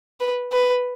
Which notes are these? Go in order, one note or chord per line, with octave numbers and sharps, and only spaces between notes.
B4
B4